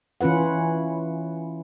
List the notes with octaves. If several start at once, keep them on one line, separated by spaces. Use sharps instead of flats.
E3 C#4 F4 B4 F#5